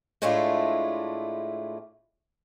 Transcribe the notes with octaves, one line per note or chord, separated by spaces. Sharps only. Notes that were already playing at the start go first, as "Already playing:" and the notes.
A2 G#3 A3 D4 E4 F4